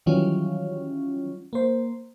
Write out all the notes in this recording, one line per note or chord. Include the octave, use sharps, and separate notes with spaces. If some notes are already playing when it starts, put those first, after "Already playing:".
D#3 E3 F#3 G3 C#4 F4
A#3 C5